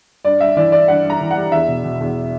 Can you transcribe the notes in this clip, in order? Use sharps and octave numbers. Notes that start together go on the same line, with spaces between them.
G2 D5
G2 E5
E3 D5
E3 D5
G2 F#5
G2 A#5
E3
F#5
G3
E2 E5
B2
B2
E2